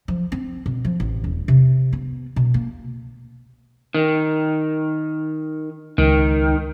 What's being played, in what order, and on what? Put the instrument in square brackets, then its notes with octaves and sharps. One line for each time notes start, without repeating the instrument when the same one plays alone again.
[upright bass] F3
C4
B2
F3
A1
E1
C3
B3
B2
A#3
[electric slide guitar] D#3
[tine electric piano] C#2 [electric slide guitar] D#3